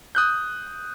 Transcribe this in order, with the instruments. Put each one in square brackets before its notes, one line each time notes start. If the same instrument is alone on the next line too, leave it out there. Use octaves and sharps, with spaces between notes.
[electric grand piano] D#6 F#6 G6